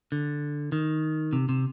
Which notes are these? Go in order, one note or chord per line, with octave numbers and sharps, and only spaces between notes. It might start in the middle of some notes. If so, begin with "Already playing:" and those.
D3
D#3
C3
C3